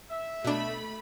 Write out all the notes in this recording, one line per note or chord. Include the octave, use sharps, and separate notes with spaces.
E5
B2 A3 D4 B5